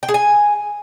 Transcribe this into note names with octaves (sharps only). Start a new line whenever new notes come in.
G5
G#4
G#5